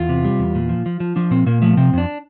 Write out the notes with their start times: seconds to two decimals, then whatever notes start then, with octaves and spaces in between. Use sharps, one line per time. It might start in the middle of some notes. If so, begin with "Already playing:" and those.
Already playing: E2 F4
0.09 C3
0.25 G3
0.39 E2
0.55 A#2
0.69 F3
0.86 F3
1.00 F3
1.16 F3 D4
1.31 A#2 C4
1.46 A#2 A#3
1.62 F3 A3
1.77 C3 C4
1.93 F2 D4